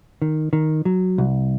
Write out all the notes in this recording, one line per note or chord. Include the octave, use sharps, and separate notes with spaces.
D#3
D#3
F#3
C2